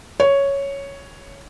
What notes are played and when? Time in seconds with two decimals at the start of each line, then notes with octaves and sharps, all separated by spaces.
0.20 C#5